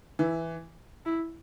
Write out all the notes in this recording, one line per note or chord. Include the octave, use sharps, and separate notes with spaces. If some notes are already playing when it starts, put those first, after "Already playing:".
E3 E4
E4